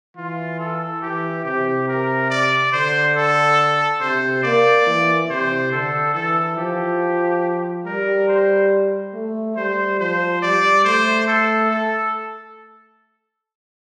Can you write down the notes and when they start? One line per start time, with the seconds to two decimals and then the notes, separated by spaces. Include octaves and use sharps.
0.16 E3 F4
0.59 A4
1.02 E3 G4
1.45 C3 G4
1.88 A#4
2.30 D5
2.72 D3 C5
3.16 A4
4.01 C3 C5
4.43 A#3 D5
4.87 E3
5.29 C3 C5
5.72 D3 A4
6.14 E3 A4
6.57 F3 G4
7.85 G3 A#4
8.28 C5
9.14 A3
9.56 G3 C5
10.00 F3 C5
10.42 G3 D5
10.84 A3 C5
11.27 A4
11.70 A4